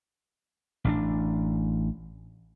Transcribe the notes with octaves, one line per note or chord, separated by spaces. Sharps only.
A1 C#4 D4